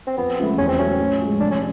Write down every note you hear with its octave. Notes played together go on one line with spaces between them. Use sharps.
C4
F2 B3
C#3 F3 A3
E2 C#4
C4
C#3 F#3 A3 C#4
A2
F3 G#3
F1 D4
C#4